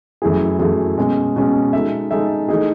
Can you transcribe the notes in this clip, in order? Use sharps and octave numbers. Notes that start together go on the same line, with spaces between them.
F#2 E3 A3 E4 G#4
F#2 E3 A3 E4 G#4
B2 G#3 C#4
B2 G#3 C#4
G#3 D#4 A4 E5
G#3 D#4 A4 E5
E3 A3 D#4 G#4